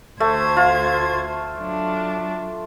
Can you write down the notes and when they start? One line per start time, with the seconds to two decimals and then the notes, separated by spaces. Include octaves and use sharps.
0.20 D2 A3 C5 G#6
0.57 F4
1.59 F#3 D4